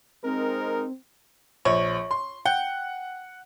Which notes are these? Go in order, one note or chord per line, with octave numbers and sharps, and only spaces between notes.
G#3 C4 D#4 A#4
A#1 C#5
C6
F#5 G5